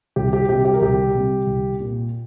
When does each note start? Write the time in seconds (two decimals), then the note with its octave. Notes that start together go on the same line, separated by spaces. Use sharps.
0.16 C2 G4
0.33 G4
0.49 C3 G3 G4
0.65 G4
0.74 A#4
0.81 C2 G4
1.15 C3 G3
1.47 C2
1.80 A#2 A#3